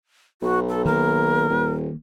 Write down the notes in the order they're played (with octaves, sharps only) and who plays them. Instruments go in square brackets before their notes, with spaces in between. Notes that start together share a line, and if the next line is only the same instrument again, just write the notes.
[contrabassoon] B1 [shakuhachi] F#4
[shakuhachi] A4
[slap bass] D#3 A#3 [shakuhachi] A#4
[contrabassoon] D#1